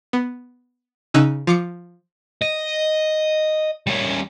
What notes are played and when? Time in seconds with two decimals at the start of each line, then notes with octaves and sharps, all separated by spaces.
0.13 B3
1.14 C#3 C#4 D#4 E6 F#6
1.47 F3 D6 C#7
2.42 D#5
3.87 G3 C#4